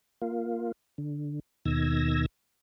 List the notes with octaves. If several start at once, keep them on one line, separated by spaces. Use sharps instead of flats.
A#3 F4
D3
D#2 B2 D#3 E6 G#6 A#6